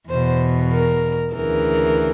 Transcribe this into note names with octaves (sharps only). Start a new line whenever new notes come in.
E2 B2 C5
A#4
D2 C#3 E3 A#4